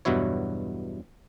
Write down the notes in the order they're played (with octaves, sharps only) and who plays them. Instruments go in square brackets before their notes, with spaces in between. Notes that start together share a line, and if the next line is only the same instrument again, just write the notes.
[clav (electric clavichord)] E2 G2 B2 F#3 E4 C#5